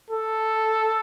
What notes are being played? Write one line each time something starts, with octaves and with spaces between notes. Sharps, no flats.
A4